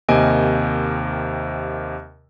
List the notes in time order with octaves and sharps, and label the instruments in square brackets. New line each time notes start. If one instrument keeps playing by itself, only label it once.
[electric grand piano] D#2 C3 A#3 D#5 G#5 D7